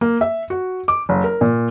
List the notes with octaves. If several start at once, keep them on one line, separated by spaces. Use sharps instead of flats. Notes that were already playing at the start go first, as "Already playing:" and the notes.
A#3
E5
F#4
D6
F#1
A#4
A#2